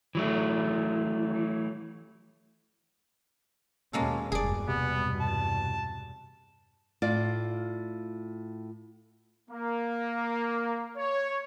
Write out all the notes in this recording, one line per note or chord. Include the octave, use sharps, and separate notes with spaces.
E3 F#3 A3
D#2 B2 G#3 A#3 C#4 A4
F1 E2 G2 B2 G#4 D5
C3 B3
A5
A2 F4 D5
A#3
C#5